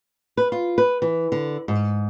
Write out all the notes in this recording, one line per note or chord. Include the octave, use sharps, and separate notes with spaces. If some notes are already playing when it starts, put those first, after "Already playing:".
B4
F4
B4
E3
D3
G#2